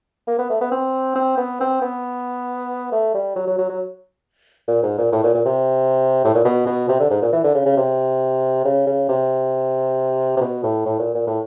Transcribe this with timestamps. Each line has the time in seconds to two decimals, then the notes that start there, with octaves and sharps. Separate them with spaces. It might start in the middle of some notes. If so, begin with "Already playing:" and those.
0.27 A#3
0.39 B3
0.50 A3
0.61 B3
0.72 C4
1.15 C4
1.37 B3
1.60 C4
1.82 B3
2.92 A3
3.14 G3
3.36 F#3
3.47 F#3
3.58 F#3
3.69 F#3
4.68 A#2
4.83 G#2
4.98 A#2
5.12 A2
5.24 A#2
5.34 A#2
5.45 C3
6.24 A2
6.35 A#2
6.45 B2
6.67 B2
6.89 C3
7.00 D3
7.10 G#2
7.22 A#2
7.33 E3
7.44 D3
7.55 C#3
7.66 C#3
7.77 C3
8.65 C#3
8.87 C#3
9.09 C3
10.37 C3
10.41 B2
10.63 A2
10.85 A2
10.99 A#2
11.15 A#2
11.27 A2